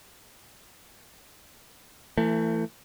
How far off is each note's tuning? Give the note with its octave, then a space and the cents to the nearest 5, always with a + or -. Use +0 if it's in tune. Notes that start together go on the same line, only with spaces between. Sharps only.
E3 +20 A3 +35